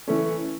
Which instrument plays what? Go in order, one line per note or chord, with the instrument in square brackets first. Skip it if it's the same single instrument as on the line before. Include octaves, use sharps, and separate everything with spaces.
[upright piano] E3 A3 C#4